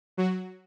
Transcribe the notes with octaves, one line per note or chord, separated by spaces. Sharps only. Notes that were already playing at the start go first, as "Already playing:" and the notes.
F#3 F#4